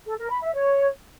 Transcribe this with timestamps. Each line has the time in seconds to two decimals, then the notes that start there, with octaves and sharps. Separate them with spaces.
0.07 A4
0.19 A#4
0.30 B5
0.42 E5
0.54 C#5